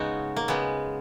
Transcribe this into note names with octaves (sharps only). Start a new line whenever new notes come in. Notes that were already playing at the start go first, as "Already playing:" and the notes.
Already playing: C#3 G#3 B3 C#4 D#4 F#4
A#3
C#3 G#3 B3